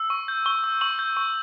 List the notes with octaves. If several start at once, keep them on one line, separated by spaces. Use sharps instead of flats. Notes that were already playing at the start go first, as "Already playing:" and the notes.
Already playing: E6
C#6
G6
C#6 G7
E6
C#6 F#7
G6
C#6